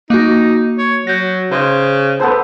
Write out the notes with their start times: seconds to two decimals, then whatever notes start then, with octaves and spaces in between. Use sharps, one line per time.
0.10 A#3 D#4 F#4
0.79 C#5
1.07 F#3 G6 A#6
1.51 C#3 C5 D#5
2.20 B3 A4 C5